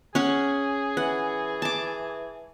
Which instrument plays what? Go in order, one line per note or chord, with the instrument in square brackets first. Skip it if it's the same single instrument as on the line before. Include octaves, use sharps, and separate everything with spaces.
[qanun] C#4 F#5 [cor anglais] G#4
[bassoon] E3 [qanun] F#5
[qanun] A5 D6